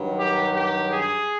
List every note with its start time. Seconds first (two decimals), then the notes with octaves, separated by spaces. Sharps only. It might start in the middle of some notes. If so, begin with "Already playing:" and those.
Already playing: G2 D#3 F#3
0.19 G4
0.53 G4
0.90 G#4